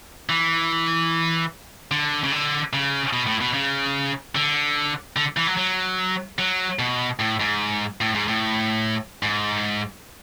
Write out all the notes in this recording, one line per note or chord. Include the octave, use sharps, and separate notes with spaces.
E3
D3
C#3
D3
C#3
B2
A2
B2
C#3
D3
D3
E3
F#3
F#3
F#3
B2
A2
G#2
A2
G#2
A2
G#2